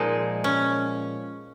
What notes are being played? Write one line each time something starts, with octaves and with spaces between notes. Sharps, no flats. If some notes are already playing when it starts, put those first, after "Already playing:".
Already playing: A#2 F3 G#3 D#4
C#4